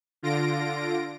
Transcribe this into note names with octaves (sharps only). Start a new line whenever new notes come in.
D3 F4 A#6 D7